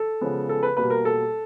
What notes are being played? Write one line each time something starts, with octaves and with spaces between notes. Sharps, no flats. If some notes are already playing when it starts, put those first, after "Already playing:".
Already playing: A4
C#3 F3 G#3 B3
A4
B4
B2 G3 A#3 B4
A#4
A4